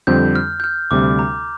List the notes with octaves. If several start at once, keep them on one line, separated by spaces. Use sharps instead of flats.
F2 D3 G3 C4 G6
F6
G6
F6
D2 C3 G3 D6
A#5